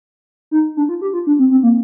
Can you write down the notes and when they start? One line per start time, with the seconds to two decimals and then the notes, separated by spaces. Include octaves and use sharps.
0.51 D#4
0.77 D4
0.89 F4
1.02 G4
1.14 F4
1.27 D4
1.39 C4
1.51 C4
1.63 A#3